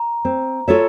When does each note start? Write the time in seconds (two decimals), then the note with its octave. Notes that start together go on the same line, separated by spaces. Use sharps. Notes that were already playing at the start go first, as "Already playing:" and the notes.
Already playing: A#5
0.25 C4
0.68 F4 A4 C#5 E5